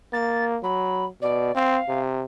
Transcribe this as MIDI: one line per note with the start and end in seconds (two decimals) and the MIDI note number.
0.13 0.58 58
0.13 0.44 93
0.63 1.08 54
0.63 1.05 83
1.22 1.50 47
1.22 1.52 74
1.55 1.79 60
1.55 2.00 77
1.89 2.24 48